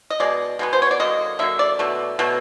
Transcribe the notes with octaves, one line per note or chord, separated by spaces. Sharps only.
D#5
B2 G#3 D5
B2 G#3 B3
C5
C#5
D5
D3 F#3 A#3 D#5
D3 F#3 A#3 E5
D5
B2 F#3 A3
B2 F#3 A3